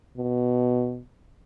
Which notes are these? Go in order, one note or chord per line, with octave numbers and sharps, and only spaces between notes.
B2